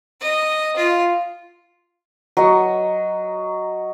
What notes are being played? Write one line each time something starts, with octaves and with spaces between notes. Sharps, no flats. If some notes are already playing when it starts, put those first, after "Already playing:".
D#5
F4
F#3 D#5 C#6